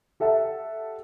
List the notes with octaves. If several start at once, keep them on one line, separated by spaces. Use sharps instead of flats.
G4 A4 E5 F#5 A5